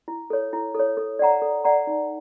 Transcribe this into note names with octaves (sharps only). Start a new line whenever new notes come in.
E4
A4 C#5
E4
A4 C#5
A4
D5 F#5 A#5
A4
D5 F#5 A#5
D#4